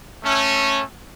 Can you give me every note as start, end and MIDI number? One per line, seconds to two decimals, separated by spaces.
0.25 0.81 57
0.25 0.81 61